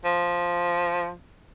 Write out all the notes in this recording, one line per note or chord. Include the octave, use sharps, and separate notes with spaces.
F3